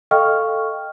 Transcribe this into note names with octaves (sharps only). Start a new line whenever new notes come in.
A4 D#5 F5 G5 C#6 F6